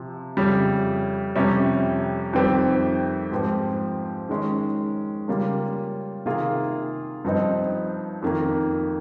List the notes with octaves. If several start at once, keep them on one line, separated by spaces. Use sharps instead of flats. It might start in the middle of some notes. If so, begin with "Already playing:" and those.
Already playing: C3 F3
F2 C#3 G3
F2 C3 G3 C#4
F2 D#3 G3 C4 G4
G#2 F3 C4 G4
D#3 G#3 C#4
C#3 G3 A#3 F4
C3 D#3 A#3 F4 G#4
G2 F3 C4 D#4
F2 D#3 A#3